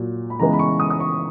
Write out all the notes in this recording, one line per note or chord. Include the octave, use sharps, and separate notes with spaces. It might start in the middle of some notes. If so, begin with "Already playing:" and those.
Already playing: A#2 F#3
B5
C#3 E3 G#3 B3 A#5
B5
C#6
D#6
D#6
C#6